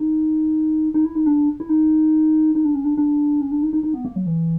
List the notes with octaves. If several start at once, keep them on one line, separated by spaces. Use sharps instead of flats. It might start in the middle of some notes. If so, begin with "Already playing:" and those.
Already playing: D#4
D#4
E4
D#4
D4
E4
D#4
D#4
D4
C#4
D4
D4
C#4
D4
D#4
D#4
D#4
B3
A#3
F#3
E3